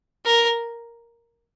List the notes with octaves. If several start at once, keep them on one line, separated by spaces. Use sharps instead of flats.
A#4